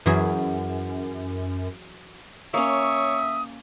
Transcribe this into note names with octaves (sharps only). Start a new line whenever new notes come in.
F#2 E3 F#3 G#4
A#3 C#4 C#5 E5 D#6